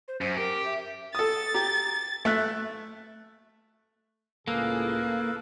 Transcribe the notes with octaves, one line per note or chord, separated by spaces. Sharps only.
C5
F#2 C5
G4 A#4
E5
A4 D#6 A6
G4 A#5
A3 E5 F#6
C#2 A2 A#3 G#4 A4 B4 F5